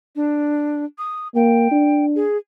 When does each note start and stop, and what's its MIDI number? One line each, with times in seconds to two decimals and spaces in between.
0.15 0.84 62
0.98 1.28 87
1.35 1.68 58
1.35 2.05 79
1.71 2.24 62
2.15 2.37 68